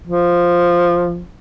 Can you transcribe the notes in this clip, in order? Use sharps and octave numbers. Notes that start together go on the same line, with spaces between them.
F3